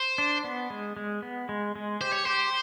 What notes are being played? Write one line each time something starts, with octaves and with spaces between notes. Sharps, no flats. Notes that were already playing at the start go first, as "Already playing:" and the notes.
Already playing: C5
D4
B3
G#3
G#3
B3
G#3
G#3
G4 C5
C#5
G4 C5